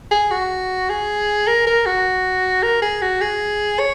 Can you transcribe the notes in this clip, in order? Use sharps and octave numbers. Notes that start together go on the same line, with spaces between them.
G#4
F#4
G#4
A#4
A#4
F#4
A#4
G#4
F#4
G#4
C#5